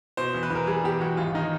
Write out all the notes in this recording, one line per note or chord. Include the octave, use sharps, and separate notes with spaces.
B2 C5
E2
B4
E2 A#4
G3 G#4
E2 G4
E2 F#4
G#1 F4
D#3 D#4